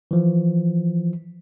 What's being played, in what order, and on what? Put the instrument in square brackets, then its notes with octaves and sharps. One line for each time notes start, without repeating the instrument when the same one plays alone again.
[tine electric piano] E3 F3